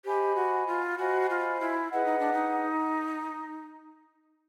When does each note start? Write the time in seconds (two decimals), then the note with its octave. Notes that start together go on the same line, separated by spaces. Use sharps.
0.05 G4 C5 D#5 G#5 B5
0.36 F#4
0.67 F4
0.98 F#4 C5 D#5 G#5 B5
1.30 F4
1.61 E4
1.92 E4 G#4 B4 D#5 F#5
2.05 D#4
2.19 D4
2.33 D#4